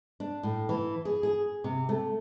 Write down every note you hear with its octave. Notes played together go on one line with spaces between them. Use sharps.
D4
A2
E3
G#4
G#4
C3
A3